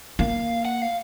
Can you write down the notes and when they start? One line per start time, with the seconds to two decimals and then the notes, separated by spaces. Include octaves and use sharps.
0.19 A#3 F5
0.65 F#5
0.82 F5